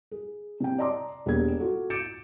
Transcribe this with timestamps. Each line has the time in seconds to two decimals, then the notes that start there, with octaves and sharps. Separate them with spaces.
0.11 G#4
0.60 C3 G5
0.78 D5 D#5 A5 A#5 C6 D6
1.26 E1 G3 A#3 B3 G#4 G#6
1.58 F4 F#4 A4
1.90 D6 G6 A6 C#7 D7 E7